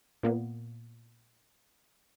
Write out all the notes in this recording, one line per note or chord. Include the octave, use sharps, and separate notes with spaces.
A#2 A#3 B3